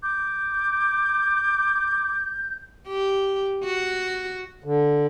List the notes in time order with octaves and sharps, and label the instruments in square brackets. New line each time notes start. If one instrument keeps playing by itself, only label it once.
[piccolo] D6 [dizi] G6
[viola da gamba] G4
F#4
[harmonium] D3